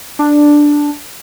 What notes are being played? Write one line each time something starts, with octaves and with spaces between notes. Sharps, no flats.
D4